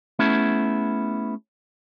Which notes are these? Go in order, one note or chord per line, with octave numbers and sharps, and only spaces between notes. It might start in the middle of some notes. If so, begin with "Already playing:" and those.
A3 B3 C#4 E4 G#4